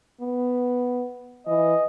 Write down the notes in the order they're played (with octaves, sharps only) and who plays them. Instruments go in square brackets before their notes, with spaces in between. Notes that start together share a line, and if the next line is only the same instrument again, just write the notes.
[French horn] B3
[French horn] E3 [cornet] D#5